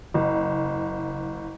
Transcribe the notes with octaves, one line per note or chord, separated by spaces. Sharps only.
F#1